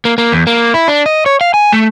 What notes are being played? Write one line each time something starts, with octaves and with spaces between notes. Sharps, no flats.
A#3
A#3
E2
A#3
E4
D4
D#5
C#5
F5
G#5
A3